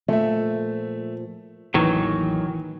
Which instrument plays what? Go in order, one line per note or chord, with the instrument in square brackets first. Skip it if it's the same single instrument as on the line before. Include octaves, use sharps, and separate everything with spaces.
[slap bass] A#2 F3 [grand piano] A3 E5
[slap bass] A1 D#2 [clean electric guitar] D#3 F#3 [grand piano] E3